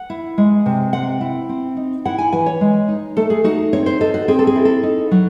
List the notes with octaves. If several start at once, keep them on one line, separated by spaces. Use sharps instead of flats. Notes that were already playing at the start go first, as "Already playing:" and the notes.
Already playing: F#5
E4
G#3
C3
C4 F#5
E4
C4
D#4
E4 F#5
G#5
E3 G#5
C#5
G#3
D#4
A3 A4
G#4
D#4 F#4
C4 C#5
C5
D#4 A4
F#4
C4 G#4
A4
G#4
E4
A4
D#4
F#3